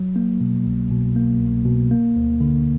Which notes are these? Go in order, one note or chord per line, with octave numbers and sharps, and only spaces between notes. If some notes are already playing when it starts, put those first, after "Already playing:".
Already playing: F#3
A#3
B2
C2
B2
A#3
C2
B2
A#3
D2
D3